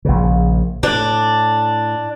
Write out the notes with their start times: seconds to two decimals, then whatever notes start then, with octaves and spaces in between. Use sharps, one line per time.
0.05 A#1 C#3
0.83 A2 D4